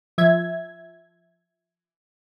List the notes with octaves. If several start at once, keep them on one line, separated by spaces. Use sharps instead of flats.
F3 E5 G#6